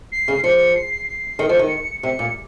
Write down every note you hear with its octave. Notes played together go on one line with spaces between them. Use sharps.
C7
C#3
F3 C#7
C7
C7
D#3 C#7
F3
D#3
C3 C#7
A#2